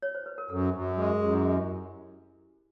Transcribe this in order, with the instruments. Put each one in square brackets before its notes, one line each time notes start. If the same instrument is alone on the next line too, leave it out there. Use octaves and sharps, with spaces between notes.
[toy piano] C#5
C5
B4
A#4
[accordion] F#2 [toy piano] A4
[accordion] F#2
[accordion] G#3 [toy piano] G#4
[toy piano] G#4
[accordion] F#2 [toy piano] G4
[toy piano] E4